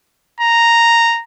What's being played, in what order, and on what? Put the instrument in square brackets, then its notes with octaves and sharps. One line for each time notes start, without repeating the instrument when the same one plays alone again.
[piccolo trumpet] A#5